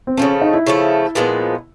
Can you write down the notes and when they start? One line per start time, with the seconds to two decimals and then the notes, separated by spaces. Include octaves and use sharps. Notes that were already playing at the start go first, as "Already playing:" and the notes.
0.07 C4
0.17 C#3 F3 A3 C#4
0.42 D#4
0.54 E4
0.66 C#3 F3 A3
1.15 A#2 F3 G#3 B3